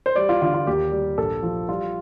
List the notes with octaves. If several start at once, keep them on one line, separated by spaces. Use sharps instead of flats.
C5
G3 D5
F4
D3 F4
F4
D#2 G4
G3
A#1 A4
F3
G3 F4